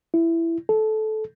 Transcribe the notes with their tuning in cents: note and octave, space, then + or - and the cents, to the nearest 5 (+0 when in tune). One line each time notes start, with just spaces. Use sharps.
E4 +10
A4 -15